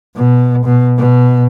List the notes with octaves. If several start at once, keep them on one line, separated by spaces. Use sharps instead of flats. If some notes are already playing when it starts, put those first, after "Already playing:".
B2
B2
B2